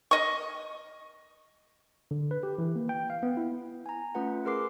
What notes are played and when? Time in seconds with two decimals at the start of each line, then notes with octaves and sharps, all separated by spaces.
0.11 D#5 C#6
2.11 D3
2.31 B4
2.43 G4
2.58 E3
2.76 A#3
2.89 G5
3.10 F5
3.23 B3
3.37 E4
3.86 G#5 A#5
4.15 A3 C#4 F4 B4 F#5
4.45 G#4 A#4 B4 C6 D6 C7